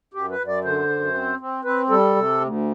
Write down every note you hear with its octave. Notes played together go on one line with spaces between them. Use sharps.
F#2 G4
B4
F#2
D5
D3 C5
F#2
C4
C4
C4 B4
G3 A4
C3
D2